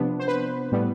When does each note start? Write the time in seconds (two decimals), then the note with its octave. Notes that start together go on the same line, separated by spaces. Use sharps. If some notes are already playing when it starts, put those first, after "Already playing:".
Already playing: C3 F3 B3 D4
0.19 C5
0.28 B4
0.72 A2 G3 B3